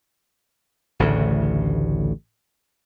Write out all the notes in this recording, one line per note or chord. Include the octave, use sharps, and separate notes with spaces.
A1 D2 A2 C#3